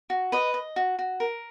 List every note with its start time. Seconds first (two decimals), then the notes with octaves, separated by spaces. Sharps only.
0.10 F#4
0.32 B4 D#5
0.54 D#5
0.76 F#4
0.99 F#4
1.20 A#4